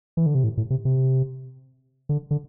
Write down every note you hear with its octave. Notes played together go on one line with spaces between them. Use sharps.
E3
D3
C3
A2
A2
C3
C3
D3
D3